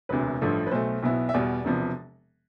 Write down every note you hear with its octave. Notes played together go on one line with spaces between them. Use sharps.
E1 D2 C3 B4
A1 G2 D3 F3 A3
B4
B1 B2 A3 C5
B1 B2 B3 E4
E5
E2 B2 G3 D5
E1 C3 F3 B3